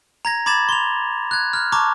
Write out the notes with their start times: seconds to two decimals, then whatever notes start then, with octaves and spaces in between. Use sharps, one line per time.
0.25 A#5 G#6 A#6
0.46 B5 D6 G#6 A6 E7
0.69 C6 F7
1.31 F#6 G#6
1.53 F6 F#6
1.72 A5 A#5 C#6 D6